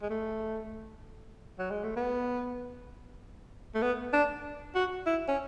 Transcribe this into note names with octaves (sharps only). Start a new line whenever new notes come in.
G#3
A3
F#3
G#3
A3
B3
A3
B3
D4
F#4
E4
C#4